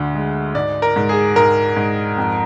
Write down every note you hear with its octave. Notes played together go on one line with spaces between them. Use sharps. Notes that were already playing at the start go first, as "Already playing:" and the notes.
Already playing: D2 D3
G#3
G#2 D5
A#4
G#2
G#4
G#2 A#4
G#2
F2